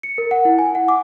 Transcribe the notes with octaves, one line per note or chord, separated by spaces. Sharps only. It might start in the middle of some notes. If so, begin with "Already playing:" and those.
C#7
A#4
F#5
E4
G#5
F#5
D6